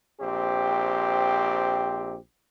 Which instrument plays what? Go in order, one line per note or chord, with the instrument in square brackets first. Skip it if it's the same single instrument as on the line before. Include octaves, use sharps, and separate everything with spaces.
[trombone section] A#1 C4 G4